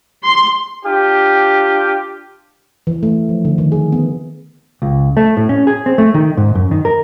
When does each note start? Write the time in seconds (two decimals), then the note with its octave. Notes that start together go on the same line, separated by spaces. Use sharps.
0.24 C6
0.85 D4 F4 G4
2.87 E3
3.03 A3
3.29 F3
3.45 D3
3.58 D#3
3.72 G#4
3.92 B3
4.82 C#2
5.17 A3
5.37 A2
5.49 C#4
5.67 G#4
5.86 C4
5.98 A3
6.14 D#3
6.37 G#2
6.55 F#2
6.71 D#3
6.85 A#4